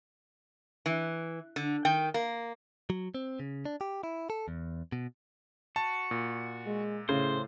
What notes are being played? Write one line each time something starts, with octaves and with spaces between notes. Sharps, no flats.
E3
D3
D#3 G5
A#3
F#3
C4
C#3
D4
G4
E4
A4
E2
B2
F#4 A5
A#2
G#3
A2 C#3 C5